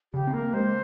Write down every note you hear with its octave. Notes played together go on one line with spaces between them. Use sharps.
C#3 G4
C4
A#3 A#4
G#3 C5